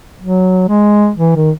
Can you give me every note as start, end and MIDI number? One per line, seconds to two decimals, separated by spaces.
0.21 0.68 54
0.68 1.10 56
1.18 1.36 52
1.36 1.51 51